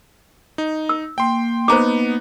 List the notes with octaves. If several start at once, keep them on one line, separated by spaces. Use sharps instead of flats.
D#4
E6
A#3 G5 C6
B3 D#4 C5 A#5 D6